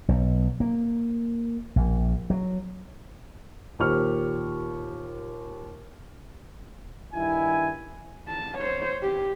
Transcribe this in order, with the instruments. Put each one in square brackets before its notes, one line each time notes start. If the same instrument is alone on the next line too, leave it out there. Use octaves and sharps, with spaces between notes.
[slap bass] B1
A#3
A#1
F#3
[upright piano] D#2 A#2 G4 C5 C#6 F6
[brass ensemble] G2 D#3 E4 G#5
[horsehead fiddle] A5
C5 C#5
G4